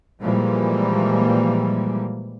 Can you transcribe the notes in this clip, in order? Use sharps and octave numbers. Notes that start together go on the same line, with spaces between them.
A#2 E3 F3 G3 G#3 A#3